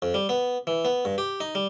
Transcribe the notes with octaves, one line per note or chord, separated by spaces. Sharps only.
F2
G3
B3
E3
B3
G2
G4
D#4
G3